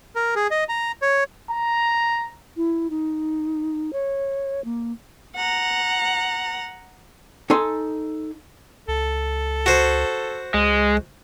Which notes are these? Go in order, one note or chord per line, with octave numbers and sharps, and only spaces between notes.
A#4
G#4
D#5
A#5
C#5
A#5
E4
D#4
C#5
A#3
F#5 A#5
D#4 A4 G#5 C6
C#2 A4
F#4 C5
C#2 G#3